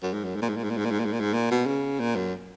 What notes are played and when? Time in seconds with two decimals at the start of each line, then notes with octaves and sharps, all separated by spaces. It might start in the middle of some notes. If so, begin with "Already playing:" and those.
0.03 F#2
0.14 G#2
0.24 F#2
0.36 G#2
0.42 A#2
0.49 G#2
0.56 A#2
0.64 G#2
0.70 A#2
0.77 G#2
0.85 A#2
0.91 G#2
0.99 A#2
1.05 G#2
1.13 A#2
1.20 G#2
1.34 A#2
1.51 B2
1.66 C#3
2.00 A#2
2.16 F#2